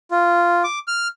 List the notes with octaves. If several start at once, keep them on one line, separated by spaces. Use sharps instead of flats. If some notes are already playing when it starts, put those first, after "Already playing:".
F4
D6
F6